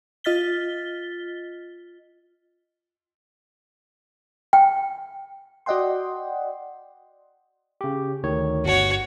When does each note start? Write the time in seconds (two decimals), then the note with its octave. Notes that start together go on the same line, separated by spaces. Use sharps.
0.24 F4 D#5 F6 A6 B6 G7
4.53 G5
5.66 F#4 D5 D#5 F#5 G5 C6
7.81 C#3 G4
8.24 D2 D#3 C#5
8.65 G1 F#4 C#5